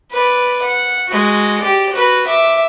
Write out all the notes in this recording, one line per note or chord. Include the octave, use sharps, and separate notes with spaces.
B4 D5
F#5
G#3 F#4
G4 D5
F#4 B4
E5 D6